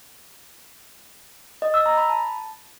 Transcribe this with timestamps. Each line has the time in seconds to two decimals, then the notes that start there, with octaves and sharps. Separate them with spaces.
1.62 D#5
1.74 E6
1.86 A#5
1.98 B5
2.09 A5